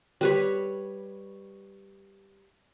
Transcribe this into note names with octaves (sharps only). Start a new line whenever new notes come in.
G3 B4 C#5